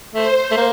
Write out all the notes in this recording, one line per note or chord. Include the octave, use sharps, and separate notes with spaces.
A3 C5
A3
A#3